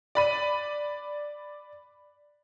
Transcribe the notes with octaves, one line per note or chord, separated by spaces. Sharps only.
D5 B5 D#7